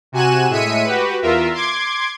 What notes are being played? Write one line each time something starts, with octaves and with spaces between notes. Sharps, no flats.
C3 F#4 G#5 F#6 D#7 E7
A2 G#3 E5 B6 C#7 D#7
F#4 G4 B4
E2 F4 A#4 E5
C6 D6 G#6